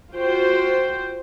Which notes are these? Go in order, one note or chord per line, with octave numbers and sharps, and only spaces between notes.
F4 F#4 C5 G5